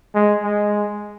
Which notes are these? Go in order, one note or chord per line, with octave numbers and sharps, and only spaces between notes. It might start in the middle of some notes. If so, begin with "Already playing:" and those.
G#3
G#3